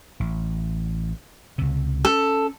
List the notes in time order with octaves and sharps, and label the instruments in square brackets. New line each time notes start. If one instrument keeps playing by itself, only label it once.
[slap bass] A1
C#2 C3
[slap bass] C#4 [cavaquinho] A4